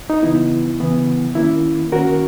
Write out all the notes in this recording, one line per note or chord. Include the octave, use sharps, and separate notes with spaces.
D#4
C#3 E3 B3 E4
C#3 E3 B3
D#3 A#3 C#4 E4
D#3 A#3 C#4 F#4 A#4